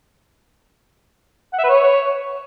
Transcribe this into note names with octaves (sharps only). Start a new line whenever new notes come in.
F#5
E5
B4
C#5